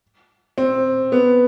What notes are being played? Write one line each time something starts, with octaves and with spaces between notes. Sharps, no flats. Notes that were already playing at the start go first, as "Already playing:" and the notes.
C4
B3